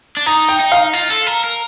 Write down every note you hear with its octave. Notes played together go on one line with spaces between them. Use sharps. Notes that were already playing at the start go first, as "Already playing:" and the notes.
D4
D#4 A#5
G5
D#4
F5
F4
A4
A#4
A#4